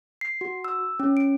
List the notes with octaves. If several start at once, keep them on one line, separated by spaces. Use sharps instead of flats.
C7
F#4
E6
C#4
D7